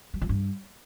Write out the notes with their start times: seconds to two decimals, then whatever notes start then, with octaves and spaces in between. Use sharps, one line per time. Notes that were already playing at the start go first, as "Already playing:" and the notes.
0.14 F#3
0.21 F3
0.29 G2